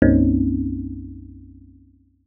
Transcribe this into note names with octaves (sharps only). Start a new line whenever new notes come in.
B1 F#2 A#3 C4 C#4 D#4